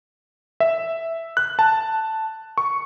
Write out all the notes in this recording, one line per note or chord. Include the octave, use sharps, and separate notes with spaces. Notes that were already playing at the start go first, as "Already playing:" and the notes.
E5
F#6
A5
C#6